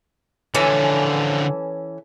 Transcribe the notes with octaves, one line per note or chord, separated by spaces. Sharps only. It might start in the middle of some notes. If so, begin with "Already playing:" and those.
D3 E3 F3 C#4 A4